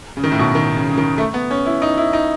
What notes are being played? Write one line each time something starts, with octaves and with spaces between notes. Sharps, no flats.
C#3
D#3
A2
B2
D#3
C#3
C#3
D#3
A3
B3
C#4
E4
D#4
E4
D#4